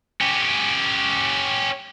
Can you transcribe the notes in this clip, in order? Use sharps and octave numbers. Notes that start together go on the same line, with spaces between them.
C#4 G4